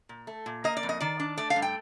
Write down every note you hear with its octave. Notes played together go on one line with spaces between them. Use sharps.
A#2
A3
A#2
A#3 D#5
D5
F2
D#5
D#3 D5
D4
A3 D5
F5
G2
G5